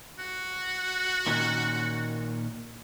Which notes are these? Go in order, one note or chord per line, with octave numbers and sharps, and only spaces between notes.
F#4
A#2 D#3 C#4